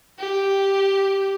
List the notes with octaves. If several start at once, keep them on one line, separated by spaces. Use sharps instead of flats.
G4